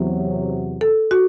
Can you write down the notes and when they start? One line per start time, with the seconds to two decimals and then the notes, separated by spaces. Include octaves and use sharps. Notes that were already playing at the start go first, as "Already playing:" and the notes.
Already playing: E2 C3 F#3
0.81 A4
1.11 F#4